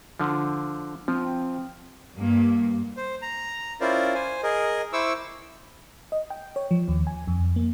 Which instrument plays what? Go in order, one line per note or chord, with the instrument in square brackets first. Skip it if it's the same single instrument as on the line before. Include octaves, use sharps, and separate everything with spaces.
[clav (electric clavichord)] D3 F3
[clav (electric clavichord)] F3 [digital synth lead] C4
[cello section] G2 A#3
[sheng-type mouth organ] C5
A#5
C#4 E4 F4 A#4 C5 D5
C5 G#5
G#4 A#4 D#5
E4 C5 C#6 D6 E6
[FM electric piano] D#5
G5
C#5
F3
D#2
G#5
F2
A#3